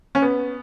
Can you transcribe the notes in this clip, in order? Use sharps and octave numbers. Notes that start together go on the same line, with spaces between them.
C#4
B3